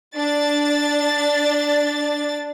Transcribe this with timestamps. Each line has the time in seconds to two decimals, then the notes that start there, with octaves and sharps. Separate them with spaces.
0.16 D4 A6